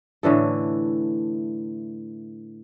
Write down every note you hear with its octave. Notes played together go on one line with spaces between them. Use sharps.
A2 D3 E3 A4